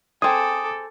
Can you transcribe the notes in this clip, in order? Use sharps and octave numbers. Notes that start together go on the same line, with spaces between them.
C4 G#4 A4 D6 D#6